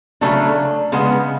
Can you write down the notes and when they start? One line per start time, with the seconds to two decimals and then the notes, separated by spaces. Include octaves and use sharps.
0.21 C#3 F#3 A3 D4
0.92 C#3 G#3 B3